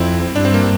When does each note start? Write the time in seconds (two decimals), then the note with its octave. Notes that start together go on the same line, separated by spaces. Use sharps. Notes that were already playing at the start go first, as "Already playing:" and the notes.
Already playing: F2 C4 E4
0.35 G2 D4
0.45 C4
0.54 A#3